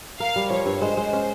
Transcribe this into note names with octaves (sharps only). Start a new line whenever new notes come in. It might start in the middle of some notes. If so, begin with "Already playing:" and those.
A#4 F5
G3
F3 C#5
G2
G#3 C5
G#3
C#4